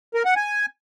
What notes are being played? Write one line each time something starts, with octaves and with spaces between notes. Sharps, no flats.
A#4
F#5
G#5